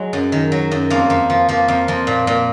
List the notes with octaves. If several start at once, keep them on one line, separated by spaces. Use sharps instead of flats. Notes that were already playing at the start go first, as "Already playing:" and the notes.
Already playing: F#3 G#3
F#2
D#3
F#3
F#2
F2 A#3
F2
F3
F3 A#3
F2
F2
A#2
A#2